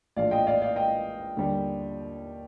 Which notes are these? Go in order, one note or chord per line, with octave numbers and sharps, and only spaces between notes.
A#1 A2 F3 D5 F5
D#5 G5
D5 F5
D5 F5
D#5 G5
D#2 D3 G3